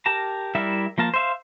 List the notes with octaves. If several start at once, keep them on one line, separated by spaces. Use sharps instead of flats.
G4 A#4 A5 A#5
G3 E4 A#4 D5 E5
F3 A#3 A#4 A5
C5 E5 F5